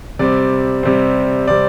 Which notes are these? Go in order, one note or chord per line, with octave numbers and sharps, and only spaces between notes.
C3 G3 C4 D5
C3 G3 C4
C3 G3 C4 D5